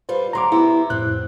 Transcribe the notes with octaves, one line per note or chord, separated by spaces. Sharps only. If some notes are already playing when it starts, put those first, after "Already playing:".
G3 F4 B4 C5
D2 F#3 F5 A#5 C6 D6
B3 E4 G4
F2 A2 C4 F#6